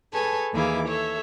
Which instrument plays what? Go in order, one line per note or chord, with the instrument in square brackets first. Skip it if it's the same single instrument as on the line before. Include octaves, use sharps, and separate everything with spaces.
[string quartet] G#4 A4 B4 C#5 G#5 A5
D#2 E3 E4 G#4 F5 D6
A4 C#5 E5